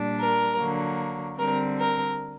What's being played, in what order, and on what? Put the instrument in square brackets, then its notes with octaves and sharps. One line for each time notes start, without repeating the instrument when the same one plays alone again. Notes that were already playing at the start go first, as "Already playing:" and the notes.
Already playing: [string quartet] A#2 G3 D4
A#4
D3 F#3 A#3
D3 G3 C4 A#4
A#4